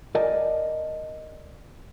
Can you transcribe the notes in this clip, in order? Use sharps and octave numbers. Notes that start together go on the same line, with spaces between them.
A#4 D5 D#5 G#5 A5